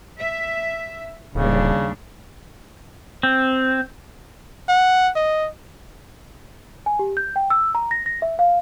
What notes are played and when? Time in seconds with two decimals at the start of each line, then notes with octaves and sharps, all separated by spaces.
0.19 E5
1.35 D1 D#2 C#3 G3 D4
3.23 C4
4.69 F#5
5.16 D#5
6.86 G#5
6.99 G4
7.17 G6
7.36 G5
7.50 E6
7.75 A#5
7.91 A#6
8.06 A#6
8.22 E5
8.39 F5